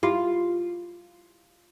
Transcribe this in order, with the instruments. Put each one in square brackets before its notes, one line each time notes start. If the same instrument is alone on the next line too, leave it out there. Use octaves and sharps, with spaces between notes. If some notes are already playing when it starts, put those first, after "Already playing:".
[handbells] E4 G4 [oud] F4